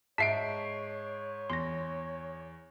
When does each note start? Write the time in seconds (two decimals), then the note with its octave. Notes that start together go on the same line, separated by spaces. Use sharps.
0.18 G#2 C#5 E5 A5 B6 C7 D7
1.50 E2 C6 A#6